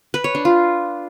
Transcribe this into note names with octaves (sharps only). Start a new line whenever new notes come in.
B4
C#5
D4
F4